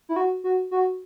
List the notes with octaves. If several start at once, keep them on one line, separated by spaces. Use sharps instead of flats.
E4
F#4
F#4
F#4